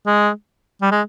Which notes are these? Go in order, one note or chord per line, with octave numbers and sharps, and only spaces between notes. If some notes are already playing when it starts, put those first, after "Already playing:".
G#3
G3
G#3